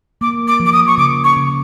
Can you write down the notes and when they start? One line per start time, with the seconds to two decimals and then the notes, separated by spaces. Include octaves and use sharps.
0.21 A#3 D6
0.48 D6
0.60 F3
0.66 D6
0.73 D#6
0.87 C#6
0.98 C#3 D6
1.24 C#6
1.36 C#3